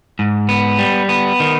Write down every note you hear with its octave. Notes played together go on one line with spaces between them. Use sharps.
G#2
B3
G3
B3
D#3